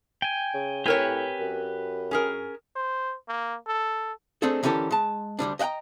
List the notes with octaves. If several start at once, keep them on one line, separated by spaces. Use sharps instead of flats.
G5 G#5
C#3
A2 C4 G4 A#4 B4 C#5 G#5
F#2
C#4 G#4 A#4
C5
A#3
A4
A3 C4 D4 D#4 G#4 A4
D3 E3 C#4 G4 A4 A#4
G#3 A5
D2 G2 G3 D4
D#5 E5 F#5 G5 A#5